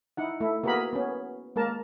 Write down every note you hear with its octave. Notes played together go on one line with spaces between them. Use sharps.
D#4 E4 F#5
A3 E4
A#3 B3 F#4 G#4 A#4 B5
B3 C#4
G#3 A#3 A#4 A5